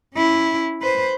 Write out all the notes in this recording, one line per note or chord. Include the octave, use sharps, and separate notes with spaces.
C#4 E4
B4 C5